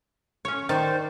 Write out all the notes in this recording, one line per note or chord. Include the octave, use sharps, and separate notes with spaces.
C#4 C#5
D#3 C5 D5